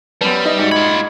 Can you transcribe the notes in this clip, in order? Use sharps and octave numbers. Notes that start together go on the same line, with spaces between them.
F#2 G3 B3 B4 A5
D#4 D#5 E5
G#2 F#4 D#5 C#7
F4 B5 G#6